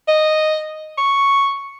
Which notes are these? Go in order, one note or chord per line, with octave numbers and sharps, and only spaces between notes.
D#5
C#6